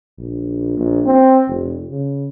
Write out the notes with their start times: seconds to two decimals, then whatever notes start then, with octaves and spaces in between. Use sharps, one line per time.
0.19 A#1
0.78 A#1
1.06 C4
1.48 F1
1.91 C#3